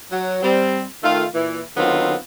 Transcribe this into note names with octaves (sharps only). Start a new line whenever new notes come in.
F#3
G3 C4
D#3 A3 F4
A#2 E3
D3 D#3 F#3 B3 C4 F4